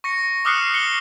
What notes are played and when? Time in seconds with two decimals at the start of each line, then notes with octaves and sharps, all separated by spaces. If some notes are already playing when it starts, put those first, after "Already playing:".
0.04 C#6 A#6 C#7
0.45 D6 D#6 F6 F#6 C7 C#7
0.74 C7 C#7 G7